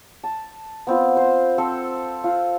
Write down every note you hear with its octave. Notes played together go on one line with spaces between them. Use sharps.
A5
B3 C4 F4
C5
C4 A4
F4